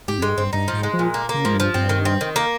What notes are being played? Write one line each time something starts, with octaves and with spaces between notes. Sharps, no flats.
G#2 G4
F2
G2 G#3
G2 C4
G2 D#4
F3
G#2
G#3
F3
A#2
A#3
A#3
C#3
G#2 F3
G2
F3
G2 C4
D#3
C4
D#3
A#3